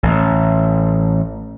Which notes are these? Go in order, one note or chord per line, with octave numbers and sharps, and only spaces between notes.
A1